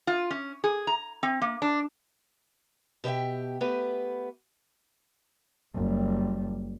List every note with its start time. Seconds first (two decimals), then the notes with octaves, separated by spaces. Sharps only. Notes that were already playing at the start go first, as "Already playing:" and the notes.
0.07 F4
0.31 C#4
0.64 G#4
0.87 A#5
1.23 C4
1.42 A#3
1.62 D4
3.04 B2 G4 D5 E5 G5
3.61 A3 B3 G4 B4
5.75 F#1 G3